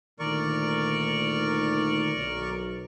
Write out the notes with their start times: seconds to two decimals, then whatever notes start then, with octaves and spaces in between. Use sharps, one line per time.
0.19 D2 A#2 D#3 A#4 D5 C#6
2.16 B1